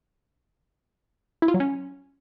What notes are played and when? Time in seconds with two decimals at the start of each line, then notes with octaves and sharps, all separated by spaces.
1.42 E4
1.48 F4
1.54 F#3
1.60 C#4